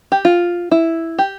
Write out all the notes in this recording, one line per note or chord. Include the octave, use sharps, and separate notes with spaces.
G4
F4
E4
G4